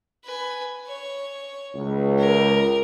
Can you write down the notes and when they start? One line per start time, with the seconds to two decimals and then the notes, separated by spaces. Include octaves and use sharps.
0.25 B4 G#5
0.87 C#5
1.76 C#2
2.19 A#4